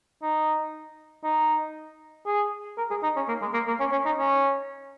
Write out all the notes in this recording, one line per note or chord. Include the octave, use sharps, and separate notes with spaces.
D#4
D#4
G#4
A#4
G#4
D#4
C#4
A#3
G#3
A#3
A#3
C#4
C#4
D#4
C#4